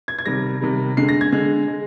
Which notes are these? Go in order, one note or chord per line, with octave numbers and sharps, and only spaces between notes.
G#6
G#6
C3 D#3 G3 A#6
C3 D#3 G3
D3 G#3 C7
A#6
G#6
D3 G#3
G#3